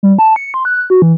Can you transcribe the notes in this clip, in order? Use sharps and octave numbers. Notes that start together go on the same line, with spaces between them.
G3
A5
C#7
C6
F#6
F#4
E3